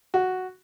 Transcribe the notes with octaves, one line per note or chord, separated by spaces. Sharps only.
F#4